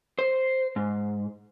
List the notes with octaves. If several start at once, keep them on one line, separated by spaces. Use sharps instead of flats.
C5
G#2